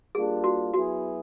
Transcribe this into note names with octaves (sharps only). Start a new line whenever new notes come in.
G3 A#3 D4 F4 G#4
F#4
F#3 B3 E4 F#4 G#4